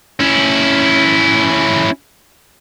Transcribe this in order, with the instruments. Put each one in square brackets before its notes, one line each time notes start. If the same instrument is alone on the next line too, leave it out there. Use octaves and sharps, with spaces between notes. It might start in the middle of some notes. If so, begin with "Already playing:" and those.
[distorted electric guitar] C#4 E4